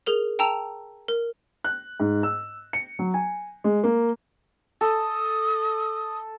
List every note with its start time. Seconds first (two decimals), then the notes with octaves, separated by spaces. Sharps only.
0.06 G#4 A#4 F7
0.39 G5 A5 A#5 E6 F7
1.08 A#4
1.64 F#6
2.00 G#2
2.23 E6
2.73 C#7
2.99 F#3
3.14 G#5
3.64 G#3
3.84 A#3
4.81 A4 D#6